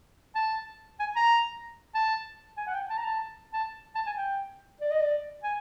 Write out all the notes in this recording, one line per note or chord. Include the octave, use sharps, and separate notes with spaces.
A5
G#5
A#5
A5
G#5
F#5
G5
A5
A#5
A5
A5
A5
G#5
G5
D5
D#5
D5
G#5